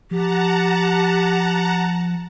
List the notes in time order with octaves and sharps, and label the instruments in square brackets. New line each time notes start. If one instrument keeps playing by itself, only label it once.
[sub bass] F3 [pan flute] G4 [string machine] F#5 A5 A#5